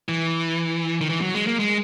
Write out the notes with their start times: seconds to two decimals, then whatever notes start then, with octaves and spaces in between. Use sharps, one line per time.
0.09 E3
1.01 D#3
1.09 E3
1.21 F#3
1.35 G#3
1.47 A#3
1.59 G#3